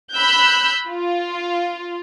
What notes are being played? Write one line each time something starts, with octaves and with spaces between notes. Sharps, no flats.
B5 E6 F#6 G6
F4